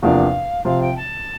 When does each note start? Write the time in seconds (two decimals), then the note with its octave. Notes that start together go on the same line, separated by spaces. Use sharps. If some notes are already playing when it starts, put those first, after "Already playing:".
0.02 E2 C3 F3 A#3 D4 F5
0.65 C3 F3 C4 F4 F5
0.81 G5
0.96 A5